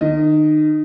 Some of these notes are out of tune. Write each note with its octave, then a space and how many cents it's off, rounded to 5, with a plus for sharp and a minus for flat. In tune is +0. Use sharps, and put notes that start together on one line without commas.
D#3 -30 D#5 +0